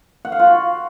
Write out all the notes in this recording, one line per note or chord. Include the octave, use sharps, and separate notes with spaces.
F#5
F5
F4
F#4